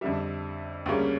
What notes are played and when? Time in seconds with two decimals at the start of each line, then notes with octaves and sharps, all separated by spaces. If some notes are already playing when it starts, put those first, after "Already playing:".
0.01 F2 D3 G3 E5
0.86 D2 C#3 G3 A#3 C#4